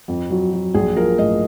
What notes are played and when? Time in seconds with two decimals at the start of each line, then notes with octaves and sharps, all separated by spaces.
0.08 F2
0.30 F#3
0.53 F#3
0.74 A#1 G#4
0.96 F3 A#4
1.18 A2 D#5